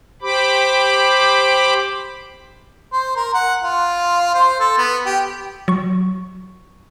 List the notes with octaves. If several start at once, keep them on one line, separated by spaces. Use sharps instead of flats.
G4 C5 B5 D6
C5
A#4
F#5
F4
C5
A4
B3
G4
F#3 C#6